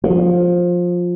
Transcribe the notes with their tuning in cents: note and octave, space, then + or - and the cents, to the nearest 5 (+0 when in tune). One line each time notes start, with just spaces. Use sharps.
F3 +15